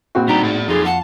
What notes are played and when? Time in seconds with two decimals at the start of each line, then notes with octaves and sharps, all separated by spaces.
0.15 A#1 C4 F#4
0.28 D2 G3 D4 D#4 G4 A#5
0.43 A2 G#4 D5
0.68 F2 D#4 F4 G#4 A4
0.86 F#5 A5